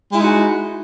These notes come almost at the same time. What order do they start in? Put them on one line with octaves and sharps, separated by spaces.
G#3 E4 D#4 F#4